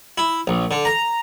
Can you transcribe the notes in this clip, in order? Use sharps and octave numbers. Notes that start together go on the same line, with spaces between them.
E4
A#1
D3
A#5